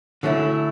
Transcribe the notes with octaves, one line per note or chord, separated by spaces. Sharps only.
D3 F#3 A3 C#4 E4